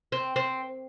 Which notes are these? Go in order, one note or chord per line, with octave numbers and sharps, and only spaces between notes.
C4
C4